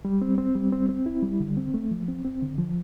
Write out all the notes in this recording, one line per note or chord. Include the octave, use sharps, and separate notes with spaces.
G3
C4
C4
G3
C4
C4
E4
G3
D3
C4
A3
F3
C4
C4
D3
F3